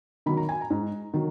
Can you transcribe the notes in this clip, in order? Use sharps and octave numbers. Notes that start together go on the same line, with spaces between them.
D#3 F#3 B5
A#5
G#5
A#5
G#2
D#3 F#3